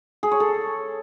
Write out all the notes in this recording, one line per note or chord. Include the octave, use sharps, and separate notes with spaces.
G#4
C#5
A4